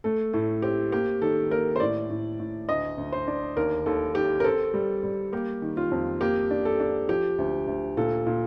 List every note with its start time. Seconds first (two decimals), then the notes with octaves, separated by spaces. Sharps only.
0.04 A3 A4
0.33 A2 A4
0.62 C4 G4
0.92 A#3 G4
1.22 D#3 A4
1.51 A#3 A#4
1.76 C5
1.80 A2 D5
2.10 A2
2.39 A2
2.69 D2 D#5
2.98 D2
3.12 C5
3.27 D4
3.57 D#2 A#4
3.86 D#2 A4
4.15 D#2 G4
4.40 A#4
4.44 C4 A4
4.74 G3
5.03 G3
5.33 A#3 G4
5.62 D#3
5.77 F4
5.91 F2
6.21 A#3 G4
6.51 D4
6.65 A4
6.80 D4
7.09 F3 G4
7.38 D2
7.67 D2
7.97 A#2 A4
8.27 A#2